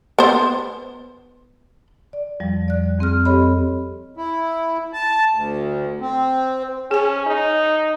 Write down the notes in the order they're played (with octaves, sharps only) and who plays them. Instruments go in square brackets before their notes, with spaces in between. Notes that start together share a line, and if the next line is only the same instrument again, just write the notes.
[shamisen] B3 C5
[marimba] D5
F2 F3 G3
D5 F#6
F2 C4 G#4 F6
C4 G4 A4 C#5 D#5 B5
[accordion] E4
A5
D2
C4
[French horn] C#4 [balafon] G#4 G#5
[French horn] D#4